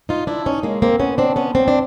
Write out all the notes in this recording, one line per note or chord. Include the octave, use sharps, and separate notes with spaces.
D#4 F4
D4 E4
C#4 D#4
G#3 A#3
A#3 C4
B3 C#4
C4 D4
B3 C#4
C4 D4
D4